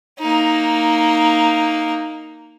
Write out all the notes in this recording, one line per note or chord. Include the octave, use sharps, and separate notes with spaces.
A#3 D#4